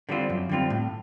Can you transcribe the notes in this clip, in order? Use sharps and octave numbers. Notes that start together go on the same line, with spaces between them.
D3 G3 C4 F4
F#2
D3 G3 C4 F4
A2